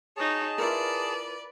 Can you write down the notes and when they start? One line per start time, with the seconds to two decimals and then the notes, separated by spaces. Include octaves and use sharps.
0.17 D#4 F#4 G#4 C#5 A5
0.58 E4 F4 A#4 B4 D5